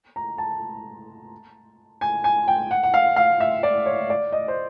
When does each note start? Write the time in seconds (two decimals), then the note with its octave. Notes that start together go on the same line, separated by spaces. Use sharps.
0.16 A#5
0.38 A5
2.01 G#5
2.24 G#5
2.48 G5
2.71 F#5
2.83 F#5
2.94 F5
3.16 F5
3.40 E5
3.63 D5
3.86 C#5
4.10 D5
4.32 D#5
4.48 C5